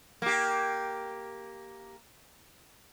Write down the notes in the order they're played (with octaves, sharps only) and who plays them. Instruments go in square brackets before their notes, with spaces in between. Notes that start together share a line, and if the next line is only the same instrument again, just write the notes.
[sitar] A#3 G4